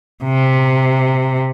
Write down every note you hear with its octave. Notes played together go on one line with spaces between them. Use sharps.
C3